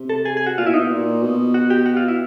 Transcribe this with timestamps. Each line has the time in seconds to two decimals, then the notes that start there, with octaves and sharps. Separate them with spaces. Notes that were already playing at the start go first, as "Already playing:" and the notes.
Already playing: C3
0.09 A4
0.25 G#4
0.37 G#4
0.46 F#4
0.57 A#2 F4
0.66 B2 E4
0.74 D#4
0.79 B2
0.90 A#2
1.22 B2
1.54 F#4
1.70 G4
1.86 F#4
1.97 F4
2.08 E4